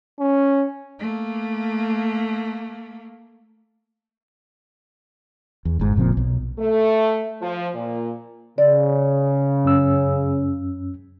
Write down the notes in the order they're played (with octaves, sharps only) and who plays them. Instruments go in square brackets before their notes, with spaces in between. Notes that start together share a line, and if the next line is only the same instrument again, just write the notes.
[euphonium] C#4
[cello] A3 A#3
[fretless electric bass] E2
G1 G#2
F#1 A#2 F3 C4
B1
[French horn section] A3
F3
A#2
[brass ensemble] C#3 [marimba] D5
[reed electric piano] F#2 C#4 E6